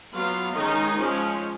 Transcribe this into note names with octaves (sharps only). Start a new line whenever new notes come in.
F#3 B3 F4 F5
D#3 G#3 C#4 D#4 D#5
F3 G#3 C#4